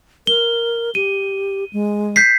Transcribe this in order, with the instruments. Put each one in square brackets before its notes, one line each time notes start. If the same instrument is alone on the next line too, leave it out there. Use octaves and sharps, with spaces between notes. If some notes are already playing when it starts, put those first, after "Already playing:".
[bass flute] A#4 [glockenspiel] G7
[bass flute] G4 [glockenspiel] D#7
[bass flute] G#3
[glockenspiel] G6 B6 C7